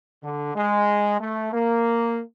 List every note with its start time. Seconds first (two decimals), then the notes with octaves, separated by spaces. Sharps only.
0.23 D3
0.56 G#3
1.20 A3
1.53 A#3